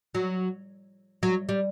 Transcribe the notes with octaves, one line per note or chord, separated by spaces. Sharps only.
F#3
F#3
G3